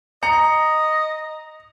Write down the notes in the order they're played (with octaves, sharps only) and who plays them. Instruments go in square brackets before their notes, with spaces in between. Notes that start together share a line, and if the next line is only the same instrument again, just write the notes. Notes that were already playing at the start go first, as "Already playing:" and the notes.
[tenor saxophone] D#5 [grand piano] A#5 C#7